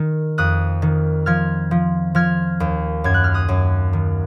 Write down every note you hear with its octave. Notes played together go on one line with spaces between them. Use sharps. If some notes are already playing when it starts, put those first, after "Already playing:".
Already playing: D#3
F2 D#6 F#6
D#3
F3 F6 G#6
F3
F3 F6 G#6
D#2
F#2 G#6
F#6
F6
D#6 F#6
F#2
D#3